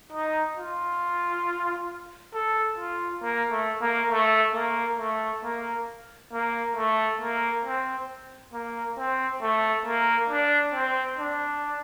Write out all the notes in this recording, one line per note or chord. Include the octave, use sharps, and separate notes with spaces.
D#4
F4
A4
F4
A#3
A3
A#3
A3
A#3
A3
A#3
A#3
A3
A#3
C4
A#3
C4
A3
A#3
D4
C4
D4